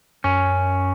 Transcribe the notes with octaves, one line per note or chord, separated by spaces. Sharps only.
F#2 C#4